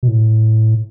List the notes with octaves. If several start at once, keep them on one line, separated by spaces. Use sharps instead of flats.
B2
A2